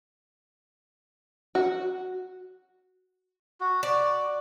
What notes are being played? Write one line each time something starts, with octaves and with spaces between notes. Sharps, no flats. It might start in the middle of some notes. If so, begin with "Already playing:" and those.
F#4
F#4
F#4 D5